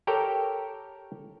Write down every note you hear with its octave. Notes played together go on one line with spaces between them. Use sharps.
G4 A4 A#4 C#5 G5